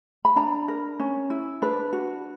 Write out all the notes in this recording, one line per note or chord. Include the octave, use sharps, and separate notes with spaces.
B5
D4 A#5
A#4
C#4
E4
D4 B4
F#4